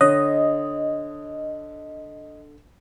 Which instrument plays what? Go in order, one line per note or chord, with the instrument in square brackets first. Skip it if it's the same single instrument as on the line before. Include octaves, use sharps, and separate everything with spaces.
[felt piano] D3 [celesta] C#5 [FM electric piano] D#5